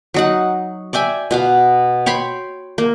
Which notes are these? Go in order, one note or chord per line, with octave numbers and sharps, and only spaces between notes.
F#3 D#4 F#5
D5 E5 G5 G#5
B2 B3 F5
C#5 G5 B5 C6
A#3